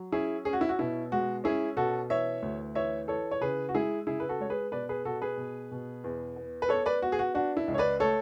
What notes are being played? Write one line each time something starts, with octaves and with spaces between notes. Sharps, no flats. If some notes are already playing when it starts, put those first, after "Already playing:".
Already playing: F#3
C#4 E4 G#4
C#4 G#4
F#4
E4
F#4
B2 E4
G#3 F#4
C#4 E4 G#4
B2 F#4 A4
E3 C#5 E5
D2
E3 C#5 E5
E3 A4 C#5
C#5
C#3 G#4 B4
F#4
G#3 E4 G#4
C#3 E4 G#4
B4
F#4 A4
G#3 C#5
G#4 B4
B2 B4 D5
G#4 B4
B2 F#4 A4
G#4 B4
B2
B2
E2
B3
B4
B3 A4 C#5
B4 D5
B3 F#4
G#4
F#4
D4 F#4
E4
C#2
C#5
B4 D5
A3 A4 C#5